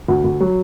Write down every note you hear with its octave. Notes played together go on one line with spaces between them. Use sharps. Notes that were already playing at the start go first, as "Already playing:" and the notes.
D2
D2
F#3